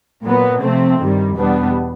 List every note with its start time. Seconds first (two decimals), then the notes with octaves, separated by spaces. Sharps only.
0.24 A#2 F#3 B3
0.62 C3 F3 A3 C4
0.99 G2 D#3 G3
1.36 E2 B2 G3 B3 D4